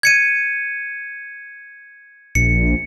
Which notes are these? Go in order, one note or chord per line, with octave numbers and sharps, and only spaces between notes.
G#6 C#7 D#7
A#1 C#7